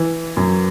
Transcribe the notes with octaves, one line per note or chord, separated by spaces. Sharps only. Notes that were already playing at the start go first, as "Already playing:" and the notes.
Already playing: E3
F#2